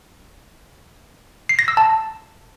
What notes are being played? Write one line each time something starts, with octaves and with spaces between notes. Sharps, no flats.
C7
A#6
E6
A5